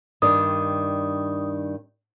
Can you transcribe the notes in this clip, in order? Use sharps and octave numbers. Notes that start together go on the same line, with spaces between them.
G2 D#3 D4 D#6